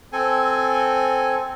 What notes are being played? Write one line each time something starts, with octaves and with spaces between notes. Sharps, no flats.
C4 A4 G#5